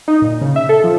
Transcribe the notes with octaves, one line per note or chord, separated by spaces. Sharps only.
D#4
A#2
C#3
E5
A4
F3